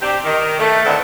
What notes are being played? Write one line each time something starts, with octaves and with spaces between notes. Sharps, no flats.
C3 D4 G4
D#3
A3
A2 D3 D#3 B3 C4